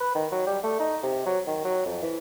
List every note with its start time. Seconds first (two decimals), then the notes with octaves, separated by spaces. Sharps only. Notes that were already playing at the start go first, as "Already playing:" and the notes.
0.01 B4
0.15 D#3
0.32 F#3
0.47 G3
0.64 A3
0.80 D#4
1.03 C3
1.26 F#3
1.47 D#3
1.65 F#3
1.86 F2
2.03 E3